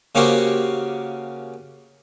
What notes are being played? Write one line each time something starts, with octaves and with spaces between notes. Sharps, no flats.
C#3 A#3 C#4 F#4 G4 C5